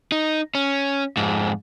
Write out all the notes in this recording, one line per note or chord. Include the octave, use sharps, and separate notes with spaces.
D#4
C#4
F2 G#2